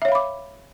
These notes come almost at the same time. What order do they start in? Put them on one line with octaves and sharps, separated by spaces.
E5 C#5 F5 B5 D6